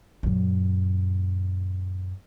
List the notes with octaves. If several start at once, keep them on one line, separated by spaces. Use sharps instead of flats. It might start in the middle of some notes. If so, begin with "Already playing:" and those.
F#2 A#2